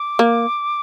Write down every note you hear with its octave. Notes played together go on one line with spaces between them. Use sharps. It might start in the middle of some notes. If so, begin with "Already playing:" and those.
Already playing: D6
A#3